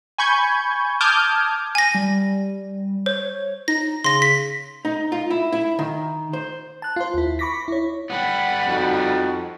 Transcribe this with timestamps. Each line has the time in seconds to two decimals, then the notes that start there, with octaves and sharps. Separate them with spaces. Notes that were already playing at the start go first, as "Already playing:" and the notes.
0.18 G#5 B5 C#6 G6 G#6
1.01 A5 D6 D#6 F6 G6 G#6
1.75 G#5 A#6
1.94 G3
3.06 C5 C#5
3.68 D#4 A#6
4.04 C#3 C6 A#6
4.22 B6
4.85 D#4
5.12 F4
5.30 E4
5.53 E4
5.79 D#3
6.33 C5
6.82 A5 F#6
6.96 F4 C5
7.14 D#2 E4
7.39 B5 C#6 D6 A#6 B6
7.68 E4 C#5
8.10 G3 B3 F#5 B5
8.67 F2 D#4 F#4